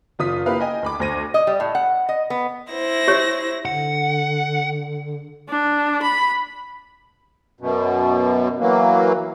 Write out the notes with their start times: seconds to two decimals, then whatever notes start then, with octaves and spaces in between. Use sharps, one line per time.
0.19 F#1 F4 D#6 B6
0.46 A#3 E4 G4 B4 F5
0.60 D#5 G5 G#5
0.83 D2 B5 D6
1.00 D2 C5 A#6 D#7
1.34 D#5
1.47 G3
1.60 A2
1.75 F#5
2.09 D#5
2.30 B3
2.71 E4 C5 A#6
3.08 G4 C#5
3.65 D3 F#5
5.49 D4
6.02 B5
7.61 F#2 B2
8.60 E3 F#3 A#3